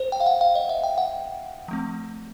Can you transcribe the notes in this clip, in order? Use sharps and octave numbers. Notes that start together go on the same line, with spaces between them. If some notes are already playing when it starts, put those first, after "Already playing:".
Already playing: C5
G5
F5
F#5
F5
D#5
E5
G5
F#5
F3 A3 C4